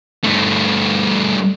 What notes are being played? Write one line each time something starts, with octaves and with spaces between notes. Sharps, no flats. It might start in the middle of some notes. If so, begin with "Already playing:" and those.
G2 A3